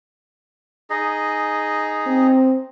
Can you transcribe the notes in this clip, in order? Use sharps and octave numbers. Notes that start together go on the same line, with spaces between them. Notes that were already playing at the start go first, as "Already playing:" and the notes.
D#4 G#4 D#5
C4